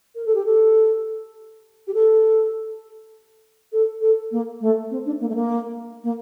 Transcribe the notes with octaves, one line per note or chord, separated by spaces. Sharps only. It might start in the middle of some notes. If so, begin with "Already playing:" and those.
A#4
A4
G4
A4
G4
A4
A4
A4
A#3
A3
C4
D4
A#3
A3
A#3
A#3